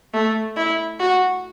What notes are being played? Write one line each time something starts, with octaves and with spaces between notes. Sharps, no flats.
A3
E4
F#4